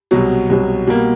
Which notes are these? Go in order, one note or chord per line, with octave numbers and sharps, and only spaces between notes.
C2 B2 F#3
C2 B2 F#3
B2 G3 A#3